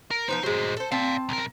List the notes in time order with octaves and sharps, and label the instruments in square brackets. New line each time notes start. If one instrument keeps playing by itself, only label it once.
[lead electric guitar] A#4
[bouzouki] F3 B3 C5 [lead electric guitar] D#4
[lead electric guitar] A#2 C5 [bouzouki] F#3 G#3
[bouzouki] A4 C5
[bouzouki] C4 A5 [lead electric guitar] D5 F5
[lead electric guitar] B1 A#4